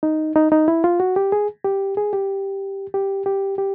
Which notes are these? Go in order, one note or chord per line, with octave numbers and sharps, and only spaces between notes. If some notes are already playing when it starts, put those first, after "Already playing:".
D#4
D#4
D#4
E4
F4
F#4
G4
G#4
G4
G#4
G4
G4
G4
G4